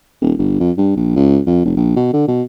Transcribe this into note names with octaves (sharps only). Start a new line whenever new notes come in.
D#1
G1
F2
G2
A#1
C#2
F2
F1
A#1
B2
D3
B2